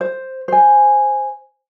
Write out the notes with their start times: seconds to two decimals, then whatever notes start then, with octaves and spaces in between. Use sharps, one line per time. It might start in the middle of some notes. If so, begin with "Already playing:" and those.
0.01 C5
0.48 C5 G#5